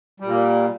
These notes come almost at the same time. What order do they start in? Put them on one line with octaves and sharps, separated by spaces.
G3 A#2 A#3